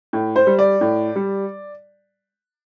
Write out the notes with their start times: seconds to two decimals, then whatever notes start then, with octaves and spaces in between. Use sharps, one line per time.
0.13 A2
0.36 C5
0.47 G3
0.59 D5
0.81 A2
1.16 G3